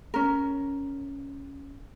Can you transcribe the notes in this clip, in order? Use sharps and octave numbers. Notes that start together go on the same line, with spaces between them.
C#4 A#4